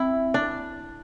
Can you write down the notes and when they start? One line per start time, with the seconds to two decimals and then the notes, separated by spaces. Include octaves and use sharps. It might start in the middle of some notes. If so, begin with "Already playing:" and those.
Already playing: C4 E4
0.34 D4